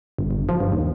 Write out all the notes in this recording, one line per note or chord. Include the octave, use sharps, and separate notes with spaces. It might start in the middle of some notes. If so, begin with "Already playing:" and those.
G1
G1
F3
G2
D#2